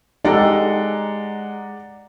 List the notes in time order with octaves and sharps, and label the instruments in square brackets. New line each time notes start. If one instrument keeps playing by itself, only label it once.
[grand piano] G#3 [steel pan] D#4 G4 A4 [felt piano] D5 F#5 A#5